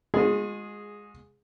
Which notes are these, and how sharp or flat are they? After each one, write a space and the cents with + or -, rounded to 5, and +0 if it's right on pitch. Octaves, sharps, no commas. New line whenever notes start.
G#3 -10 F4 +45 G#4 +0